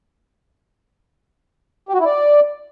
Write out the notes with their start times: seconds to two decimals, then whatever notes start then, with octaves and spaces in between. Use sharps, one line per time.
1.89 G4
1.94 F#4
2.00 E4
2.05 D5